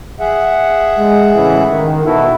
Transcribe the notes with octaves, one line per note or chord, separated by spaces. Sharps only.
G#4 E5 F#5
G#3
A2 C#3 E3
D#3
B2 E4 F#4 A4